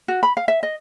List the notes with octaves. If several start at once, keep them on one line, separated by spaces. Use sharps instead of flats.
F#4
B5
F5
E5
D#5